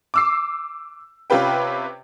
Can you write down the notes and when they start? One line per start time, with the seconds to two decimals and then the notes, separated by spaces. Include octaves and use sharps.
0.14 D6 E6 C7
1.30 C3 C#4 F4 G4 B4 G5